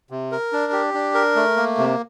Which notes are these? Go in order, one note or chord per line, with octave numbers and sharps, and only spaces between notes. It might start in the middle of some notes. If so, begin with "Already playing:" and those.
C3
A#4
D4
G4
D4
A#4
A3
A#3
C3